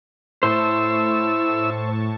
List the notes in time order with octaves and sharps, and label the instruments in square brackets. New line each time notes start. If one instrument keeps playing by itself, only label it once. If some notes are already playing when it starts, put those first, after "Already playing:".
[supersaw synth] A2 A5 C#6 [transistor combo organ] E4 E6 [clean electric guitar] C5